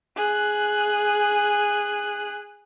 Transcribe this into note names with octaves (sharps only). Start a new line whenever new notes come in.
G#4 F#6